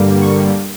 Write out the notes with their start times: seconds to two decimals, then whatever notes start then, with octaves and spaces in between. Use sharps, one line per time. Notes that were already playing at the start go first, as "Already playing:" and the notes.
Already playing: G2 D3 G3 A#3
0.22 C#6